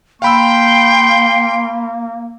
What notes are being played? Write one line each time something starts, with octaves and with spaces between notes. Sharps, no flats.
A#3 F5 G5 B5 C6 E6